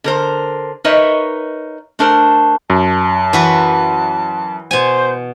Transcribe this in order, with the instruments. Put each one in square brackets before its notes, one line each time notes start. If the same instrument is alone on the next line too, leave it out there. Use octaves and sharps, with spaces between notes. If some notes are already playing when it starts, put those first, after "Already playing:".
[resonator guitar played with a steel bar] D3 A#4 C5
D#4 A#4 B4 C#5 D#5 E5
A3 D4 A#4 C5
[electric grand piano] F#2 [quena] A5
[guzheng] E3 F#4 B4
[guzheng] B2 G#5 [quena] C5